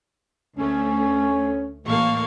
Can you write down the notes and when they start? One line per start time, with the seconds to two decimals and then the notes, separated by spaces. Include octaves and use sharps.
0.57 D2 A3 C#4
1.86 A1 A#3 A4 F5 C#6